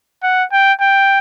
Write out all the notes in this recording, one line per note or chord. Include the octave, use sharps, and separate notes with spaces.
F#5
G5
G5